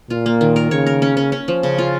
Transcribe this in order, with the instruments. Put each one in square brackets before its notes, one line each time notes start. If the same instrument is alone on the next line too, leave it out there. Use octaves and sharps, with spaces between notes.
[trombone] A#2 [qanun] F4
[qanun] A#3
D#3
A#4
[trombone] C#3 [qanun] C#5
[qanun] A#4
C#4
C#4
C#4
F3
C#3
F4